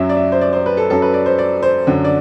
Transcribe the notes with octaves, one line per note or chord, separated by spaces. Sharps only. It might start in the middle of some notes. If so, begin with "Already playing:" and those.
Already playing: F#2 F#3 E5
D5
E5
C5
D5
C5
B4
A4
F#2 F#3 A4
B4
D5
C5
D5
C5
F#2 D3 F#3
D5